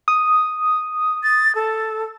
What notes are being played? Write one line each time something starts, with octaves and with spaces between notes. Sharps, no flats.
D#6
A6
A4